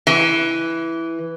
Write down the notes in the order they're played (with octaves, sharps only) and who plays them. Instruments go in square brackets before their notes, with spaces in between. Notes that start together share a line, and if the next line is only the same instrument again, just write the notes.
[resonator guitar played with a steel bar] E3